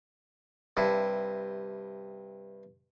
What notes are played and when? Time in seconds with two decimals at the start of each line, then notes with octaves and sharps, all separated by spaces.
0.77 G2 C3 E4